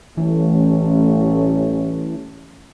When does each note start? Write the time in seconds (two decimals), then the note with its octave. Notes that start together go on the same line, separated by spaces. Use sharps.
0.17 A1 E3 G3 A3 C#4